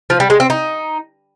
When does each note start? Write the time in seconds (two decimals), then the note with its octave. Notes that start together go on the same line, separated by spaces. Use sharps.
0.10 F3
0.20 G3
0.30 G#3
0.40 C4
0.50 D#4